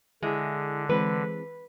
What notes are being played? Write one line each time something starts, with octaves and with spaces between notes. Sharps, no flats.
D3 G#3 E4 G#4
E3 G#3 C4 B4